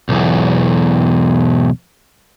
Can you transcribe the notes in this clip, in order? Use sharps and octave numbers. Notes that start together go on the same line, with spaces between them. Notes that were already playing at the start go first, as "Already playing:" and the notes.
B1 E2